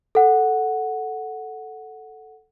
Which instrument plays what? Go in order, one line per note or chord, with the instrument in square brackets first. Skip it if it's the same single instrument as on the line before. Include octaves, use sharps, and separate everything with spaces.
[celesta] A4 F#5